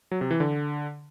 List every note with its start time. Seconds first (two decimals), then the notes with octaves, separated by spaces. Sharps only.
0.11 F#3
0.21 C3
0.31 E3
0.40 D3